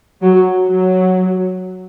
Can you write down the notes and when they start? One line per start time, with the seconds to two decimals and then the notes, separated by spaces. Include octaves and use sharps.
0.22 F#3
0.68 F#3